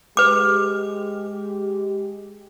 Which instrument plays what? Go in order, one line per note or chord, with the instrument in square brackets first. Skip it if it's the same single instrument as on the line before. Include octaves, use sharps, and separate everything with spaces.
[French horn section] G#3 G4 [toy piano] B4 D6